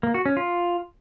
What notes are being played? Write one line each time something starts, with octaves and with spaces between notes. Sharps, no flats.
A#3
F#4
C#4
F4